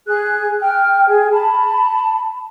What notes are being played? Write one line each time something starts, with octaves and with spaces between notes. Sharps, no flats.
G#4 F#6
G5 F6
G#4
A5 B5